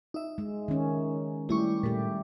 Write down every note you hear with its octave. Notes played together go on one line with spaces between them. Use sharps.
D#4 E5
G#3
D#3 C#4
G3 A3 E4 G4 C#6
A#2 A3 G4